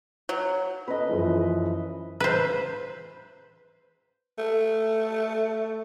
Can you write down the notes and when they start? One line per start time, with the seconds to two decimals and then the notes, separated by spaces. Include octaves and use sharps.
0.29 F#3
0.88 C#4 A4 B4 D#5
1.09 F#2 E3 F3
2.20 B4 C5
4.38 A3